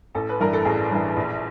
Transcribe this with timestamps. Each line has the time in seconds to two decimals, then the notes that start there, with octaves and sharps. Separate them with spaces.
0.15 A1 A4
0.29 B4
0.40 G2 E3 A#4
0.53 A4
0.65 A1 G#4
0.91 G2 E3
1.16 A#1